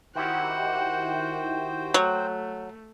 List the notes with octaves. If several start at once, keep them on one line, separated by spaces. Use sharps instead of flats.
D#3 E4 F#4 G4 C5 F#5 G5
F#3 A3